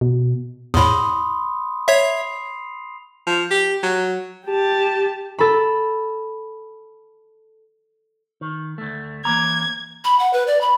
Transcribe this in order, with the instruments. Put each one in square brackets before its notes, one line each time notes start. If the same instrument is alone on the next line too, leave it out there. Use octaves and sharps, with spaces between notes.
[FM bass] B2
[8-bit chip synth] E2 A2 [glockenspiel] B5 C6 D#6
[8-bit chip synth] C#5 E5 [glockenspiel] C7 F7
[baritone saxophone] F3
G4
F#3
[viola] G4 A5
[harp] A4 B5
[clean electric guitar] D#3
D2 A3
[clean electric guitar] E3 A#3 A#5 [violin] G#6
[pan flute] B5
F#5
B4
D5
B5